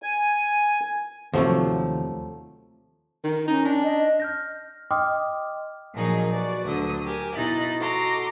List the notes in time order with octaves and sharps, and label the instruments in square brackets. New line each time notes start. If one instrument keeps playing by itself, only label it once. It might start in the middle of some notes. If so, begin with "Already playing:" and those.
[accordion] G#5
[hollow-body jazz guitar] D#2 A2 C3 [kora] F3 F#3 A3
[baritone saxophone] D#3
[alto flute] C#4 [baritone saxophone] D#4
[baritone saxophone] D4
[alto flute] D#5
[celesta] F6 G6 A#6
D#5 G5 C6 D6 D#6 F6
[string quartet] A#2 F3 F#3 D#4 G#4 A#4
F#4 B4 D5
D2 D3 F#3 D#6
G4 A#4 G#5
B2 D#4 E4 D#5 F#6 A6
F#4 A4 D#5 A#5 C6 D6